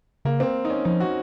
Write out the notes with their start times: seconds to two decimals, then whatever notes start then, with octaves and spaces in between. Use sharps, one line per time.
0.25 C#3 A#3
0.40 C4
0.65 D#4
0.70 C#4
0.85 F3 D#4
1.00 F#4